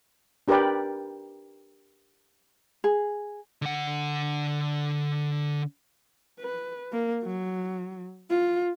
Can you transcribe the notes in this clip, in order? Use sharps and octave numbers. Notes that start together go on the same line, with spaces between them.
D4 G4 A#4 B4 D5 G5
G#4
D3 F#5
B4
A#3
F#3
F4